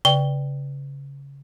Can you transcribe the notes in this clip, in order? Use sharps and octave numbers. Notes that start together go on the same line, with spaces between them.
C#3 D5 G5 G7